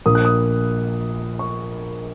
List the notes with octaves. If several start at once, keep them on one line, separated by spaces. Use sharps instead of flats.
A#1 A#2 A#3 D#6
F#6
D#6
C#6